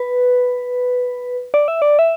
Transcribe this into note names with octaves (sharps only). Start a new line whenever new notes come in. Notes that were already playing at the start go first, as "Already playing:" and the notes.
Already playing: B4
D5
E5
D5
E5